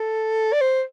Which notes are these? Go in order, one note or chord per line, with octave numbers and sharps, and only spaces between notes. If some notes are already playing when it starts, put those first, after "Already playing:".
Already playing: A4
D5
C5